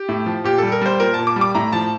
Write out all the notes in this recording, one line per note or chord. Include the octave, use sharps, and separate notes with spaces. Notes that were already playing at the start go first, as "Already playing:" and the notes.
Already playing: G4
A2
F3
A#2 G4
G3 A4
A#4
G3 C5
A#2 A#4
A#2 A5
D6
G3
D6
A2 A#5
F3 A5